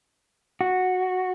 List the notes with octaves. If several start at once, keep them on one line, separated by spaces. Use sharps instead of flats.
F#4